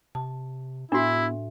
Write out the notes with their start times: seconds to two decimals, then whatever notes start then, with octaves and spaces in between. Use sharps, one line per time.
0.15 C3 A5
0.92 A2 B3 D4 E4 F#4 E5